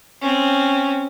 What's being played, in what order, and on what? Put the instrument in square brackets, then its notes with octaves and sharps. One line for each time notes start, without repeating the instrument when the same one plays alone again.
[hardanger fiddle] C4 C#4